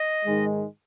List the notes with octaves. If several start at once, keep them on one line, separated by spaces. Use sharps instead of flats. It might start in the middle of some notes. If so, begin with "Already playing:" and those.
Already playing: D#5
G#2 D#3 G#3